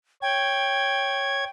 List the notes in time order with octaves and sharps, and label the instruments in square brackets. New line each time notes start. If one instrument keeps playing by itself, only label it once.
[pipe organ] C#5 G#6 [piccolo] G5